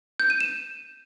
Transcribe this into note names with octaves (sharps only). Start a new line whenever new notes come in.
G6
D#7
E7